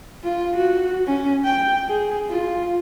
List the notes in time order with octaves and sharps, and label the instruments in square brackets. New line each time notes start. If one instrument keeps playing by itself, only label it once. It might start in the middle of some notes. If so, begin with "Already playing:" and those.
[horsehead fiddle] F4
F#4
C#4
G5
G#4
F4